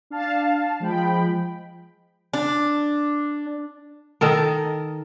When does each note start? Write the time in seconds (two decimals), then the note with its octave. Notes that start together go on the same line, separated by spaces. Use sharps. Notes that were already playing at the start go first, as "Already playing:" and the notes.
0.10 D4 F5 A5
0.80 F3 G#3 G5 B5
2.33 D4
4.21 D#3 A4 A#4